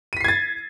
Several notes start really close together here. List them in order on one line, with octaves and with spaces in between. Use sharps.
D#7 B6 C7 G#6 A6